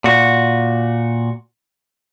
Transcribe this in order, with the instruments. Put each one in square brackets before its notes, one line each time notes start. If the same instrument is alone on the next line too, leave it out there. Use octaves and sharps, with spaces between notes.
[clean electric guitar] A#2 F#4